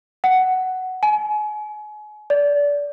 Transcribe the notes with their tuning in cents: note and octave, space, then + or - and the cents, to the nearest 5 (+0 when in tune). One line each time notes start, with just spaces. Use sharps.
F#5 +10
G#5 +30
D5 -25